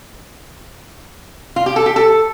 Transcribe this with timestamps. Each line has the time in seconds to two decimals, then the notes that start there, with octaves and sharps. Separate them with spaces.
1.56 F4
1.66 G4
1.76 A4
1.86 G4
1.96 A4